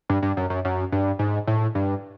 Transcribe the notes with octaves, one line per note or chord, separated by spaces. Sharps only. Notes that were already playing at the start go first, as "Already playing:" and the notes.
G2
G2
F#2
F#2
F#2
G2
G#2
A2
G2